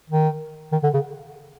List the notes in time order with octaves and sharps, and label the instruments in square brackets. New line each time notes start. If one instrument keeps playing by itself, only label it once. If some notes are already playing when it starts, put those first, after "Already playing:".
[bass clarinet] D#3
D#3
D3
C#3